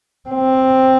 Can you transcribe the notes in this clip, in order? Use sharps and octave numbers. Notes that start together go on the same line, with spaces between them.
C4